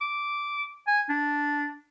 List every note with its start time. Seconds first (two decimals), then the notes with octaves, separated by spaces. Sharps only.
0.01 D6
0.87 G#5
1.09 D4